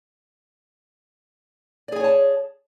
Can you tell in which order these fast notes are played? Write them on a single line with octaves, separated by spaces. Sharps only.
D5 G#4 G#5 C#5 A5